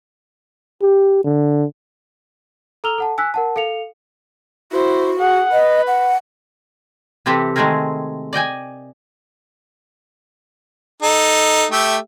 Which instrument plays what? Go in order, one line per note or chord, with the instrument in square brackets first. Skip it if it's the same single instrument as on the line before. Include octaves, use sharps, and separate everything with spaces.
[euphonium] G4
D3
[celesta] A4 A#5 E6 F6 F7 G7
A4 F#5 A5
G#5 E6 F#6 B6
A#4 F#5 A5
A4 F5 C#7 F7
[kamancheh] E4 C5 [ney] F#4
[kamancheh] G#4 F#5
[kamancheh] B4 [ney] D#5
[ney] F#5
[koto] C3 E3 C4 G4 A4 B4
D#3 G#3 A3 C4 G#4 A#4
D5 D#5 G5 G#5
[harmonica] D#4 A4
A3 G4 E5